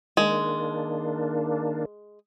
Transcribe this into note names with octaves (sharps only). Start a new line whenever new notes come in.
D#3 G#3 A#3 D4